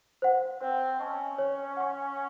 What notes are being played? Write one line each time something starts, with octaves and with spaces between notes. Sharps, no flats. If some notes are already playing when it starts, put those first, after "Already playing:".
C5 F#5
C4 C5
C#4 D#5 A5 C#6
C#5
F#5 C#6